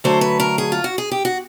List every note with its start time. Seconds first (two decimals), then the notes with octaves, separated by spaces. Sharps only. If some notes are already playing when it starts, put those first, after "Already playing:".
0.04 D3 F#3 A3 C5
0.21 B4
0.40 A#4
0.58 G#4
0.72 F4
0.84 F#4
0.98 G#4
1.11 G4
1.25 F#4